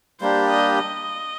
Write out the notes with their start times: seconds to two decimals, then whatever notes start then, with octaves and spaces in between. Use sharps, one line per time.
0.20 G3 A#3 D4 G4 C5
0.49 D#5
0.77 D#5